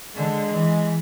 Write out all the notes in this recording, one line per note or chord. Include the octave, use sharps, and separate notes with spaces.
D3 G#3
E3